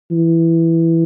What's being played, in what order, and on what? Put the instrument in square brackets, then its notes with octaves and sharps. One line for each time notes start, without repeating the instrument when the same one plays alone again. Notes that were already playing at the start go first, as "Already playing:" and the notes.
[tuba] E3